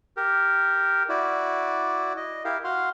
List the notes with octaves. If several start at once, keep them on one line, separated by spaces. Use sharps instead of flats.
G4 A#4
E4 F#4 D5
D#5
E4 G4 A#4 F5
F#4 F5 C6